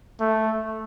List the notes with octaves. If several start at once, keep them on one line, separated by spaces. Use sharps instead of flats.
A3